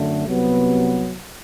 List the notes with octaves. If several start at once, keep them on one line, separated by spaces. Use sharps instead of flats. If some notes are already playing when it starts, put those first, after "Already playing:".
Already playing: F#2 D3 A3
C2 C3 F#3 B3